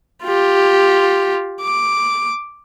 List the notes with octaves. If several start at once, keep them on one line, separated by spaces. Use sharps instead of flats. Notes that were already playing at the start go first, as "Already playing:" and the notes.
F4 G4
D6